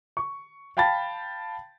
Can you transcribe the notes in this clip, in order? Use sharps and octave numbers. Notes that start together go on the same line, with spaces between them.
C#6
F5 G5 A5 B5 A6